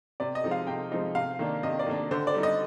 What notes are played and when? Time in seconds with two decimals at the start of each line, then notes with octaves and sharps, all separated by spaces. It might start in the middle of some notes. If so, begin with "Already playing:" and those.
0.20 C3 D5
0.35 D#5
0.44 F3 G#3 C4 D#4
0.51 F5
0.67 C3 G5
0.92 F3 G#3 C4 D#4
1.15 C3 F5
1.39 D#3 A#3 D4
1.63 C3 D#5
1.79 D5
1.87 D#3 A#3 D4
2.11 D3 C5
2.27 D5
2.35 G3 C4 D#4
2.43 D#5